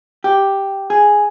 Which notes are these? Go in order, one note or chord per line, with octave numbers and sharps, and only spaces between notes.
G4
G#4